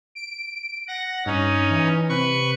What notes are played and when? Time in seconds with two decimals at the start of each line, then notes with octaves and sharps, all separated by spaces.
0.15 D7
0.88 F#5 A#6
1.26 G2 C#4 D#4
1.71 E3
2.09 C3 B4 C#6